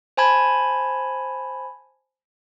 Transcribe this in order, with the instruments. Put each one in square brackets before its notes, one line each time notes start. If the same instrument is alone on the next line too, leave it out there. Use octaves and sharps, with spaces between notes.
[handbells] C5 G#5 A5 B5 G#6